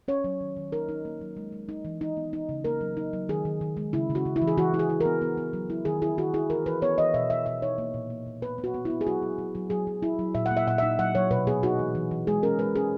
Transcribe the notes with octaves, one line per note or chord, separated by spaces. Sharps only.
C#4 C#5
F#3
D#3
D#3
D#4 A#4
D#4
A#3
F#3
G#3
G#3
D#4
E3
D#4
B3
D#4
C#3
A#3 A#4
F#3
D#4
F#3
D#3 G#4
D#3
D#3
G#3
C#3 E4
C#3
F#4
C#3
E4
E3
G#4
E3 F#4
E4
G#4
E4
B3 A#4
B3
B3
F#3
E4
D#3 G#4
E4 G#4
D#3 F#4
E4 G#4
E3 A#4
E3 B4
B3 C#5
E3 D#5
B2 E5
B2 E5
B2 E5
D#4 C#5
A#3
A#2
A#3
A#2
B3 B4
B3
F#4
B3
B3 E4
G#4
F#3 F#4
F#3
F#3
F#3
F#3 G#4
F#3
E4
F#3
A#2 E5
F#5
A#3
E5
A#2 F#5
D#4 E5
F#3 F#5
F#3 C#5
B2 B4
B3 G#4
D#4 F#4
E3
E3
E3
G#3 G#4
C#4 A#4
G#3 B4
C#4 G#4